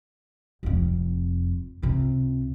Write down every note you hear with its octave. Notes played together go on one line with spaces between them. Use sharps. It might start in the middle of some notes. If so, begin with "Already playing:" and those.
F1 F2
C#2 C3